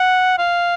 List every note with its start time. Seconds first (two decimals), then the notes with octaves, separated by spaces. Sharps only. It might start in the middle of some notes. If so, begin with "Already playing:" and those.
Already playing: F#5
0.38 F5